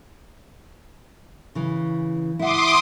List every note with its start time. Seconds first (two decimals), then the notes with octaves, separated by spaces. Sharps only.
1.55 C#3 E3
2.39 E4 F#5 C6 D6 D#6